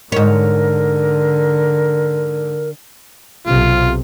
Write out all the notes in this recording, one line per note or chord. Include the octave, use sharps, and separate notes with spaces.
G#2 D3 A#4 C#5
B1 C3 F4